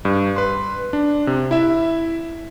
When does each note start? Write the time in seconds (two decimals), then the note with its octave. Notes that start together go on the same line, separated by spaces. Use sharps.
0.05 G2
0.36 B4 C6
0.93 D4
1.27 C3
1.51 E4 E5